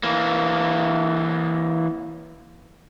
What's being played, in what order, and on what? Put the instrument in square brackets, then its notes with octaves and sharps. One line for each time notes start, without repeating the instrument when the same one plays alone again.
[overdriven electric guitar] E3 A#3